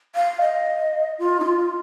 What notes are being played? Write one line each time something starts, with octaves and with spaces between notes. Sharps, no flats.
F5
D#5
F4
D#4
F4